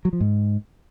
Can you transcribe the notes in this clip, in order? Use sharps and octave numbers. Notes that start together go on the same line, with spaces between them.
F#3
F3
G#2